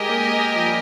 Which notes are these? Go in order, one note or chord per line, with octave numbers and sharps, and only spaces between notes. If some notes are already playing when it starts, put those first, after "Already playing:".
Already playing: G#3 G4 A#4 D#5 G#5
A#3
F3
G3